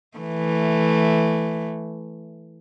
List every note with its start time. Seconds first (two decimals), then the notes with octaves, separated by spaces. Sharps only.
0.17 E3 A3